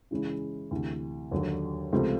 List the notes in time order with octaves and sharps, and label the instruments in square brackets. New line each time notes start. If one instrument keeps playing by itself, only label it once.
[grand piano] C#3 E3 G#3 C#4 E4
D2 C3 E3
D#2 D3 F#3
C#2 C3 F3 A3 C4